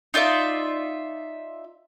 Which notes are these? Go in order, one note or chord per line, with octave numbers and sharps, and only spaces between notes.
D#4 F4 D5 E5